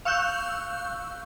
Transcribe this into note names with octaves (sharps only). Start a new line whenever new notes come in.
F5 C#6 E6 F#6 G6